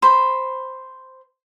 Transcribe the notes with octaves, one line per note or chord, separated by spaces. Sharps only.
C5 B5